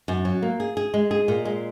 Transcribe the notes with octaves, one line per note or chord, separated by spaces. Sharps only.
F#2
F#3
A#3
G#4
G#4
G#3
G#4
A#2
G#3